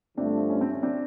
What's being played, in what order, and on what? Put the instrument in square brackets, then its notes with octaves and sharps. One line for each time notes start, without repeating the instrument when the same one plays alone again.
[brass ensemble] G2 D3 F3 A3 [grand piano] C4 D4
[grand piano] C#4
C4
C#4
C4 D4